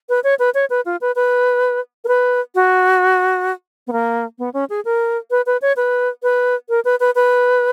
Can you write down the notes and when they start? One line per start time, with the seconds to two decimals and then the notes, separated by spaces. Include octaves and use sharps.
0.09 B4
0.24 C#5
0.39 B4
0.54 C#5
0.70 B4
0.86 F4
1.01 B4
1.16 B4
2.04 A#4
2.08 B4
2.55 F#4
3.87 B3
3.92 A#3
4.39 B3
4.54 C#4
4.70 G#4
4.85 A#4
5.31 B4
5.46 B4
5.62 C#5
5.77 B4
6.23 B4
6.69 A#4
6.85 B4
7.00 B4
7.15 B4